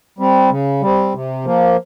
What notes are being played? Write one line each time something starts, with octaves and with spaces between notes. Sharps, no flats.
G3 C4
C#3
G3 C4
C3
F3 A#3